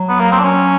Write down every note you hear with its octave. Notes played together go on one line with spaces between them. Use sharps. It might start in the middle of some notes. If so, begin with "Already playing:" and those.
Already playing: F#3
B3
A#3
C4
D4
C#4